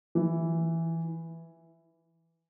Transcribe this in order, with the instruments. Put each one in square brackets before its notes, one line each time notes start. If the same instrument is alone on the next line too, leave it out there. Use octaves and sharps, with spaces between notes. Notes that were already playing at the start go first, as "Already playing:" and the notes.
[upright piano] E3